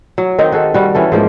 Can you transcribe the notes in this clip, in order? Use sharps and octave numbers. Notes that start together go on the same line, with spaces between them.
F#3
D#3 C4 D#4
F#4 G#4 A4
G3 F#4
E3 C#4 A4
G#2 F3 A#3